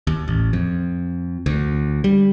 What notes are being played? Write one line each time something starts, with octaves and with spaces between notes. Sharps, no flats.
D#2
A1
F2
D2
G3